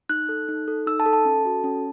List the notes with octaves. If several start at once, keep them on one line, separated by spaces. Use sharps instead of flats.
D#4 F#6
A4
D#4
A4
D#4 E6
A5
A4
A5
C#4
F#4 A4
C#4